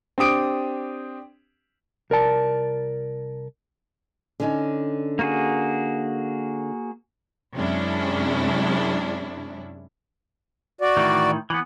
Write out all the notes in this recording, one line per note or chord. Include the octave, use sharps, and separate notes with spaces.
C4 D4 G4 D#6 D7
C2 A#4 D5 A5
D3 C#4 D#4
A#3 F#4 G#4
F#2 C3 G#3 C#4 D4 E4
F#4 D5
A2 D#3 E3
E3 B3